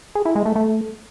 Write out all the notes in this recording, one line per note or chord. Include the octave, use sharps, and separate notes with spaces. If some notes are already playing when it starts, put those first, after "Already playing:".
G#4
E4
G#3
A3
A3